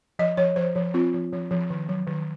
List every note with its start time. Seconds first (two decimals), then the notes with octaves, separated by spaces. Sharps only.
0.19 F3 D#5
0.37 F3 C#5
0.56 F3 C5
0.75 F3
0.94 C4 F4
1.14 F3
1.33 F3
1.51 F3
1.70 D#3
1.89 F#3
2.07 D#3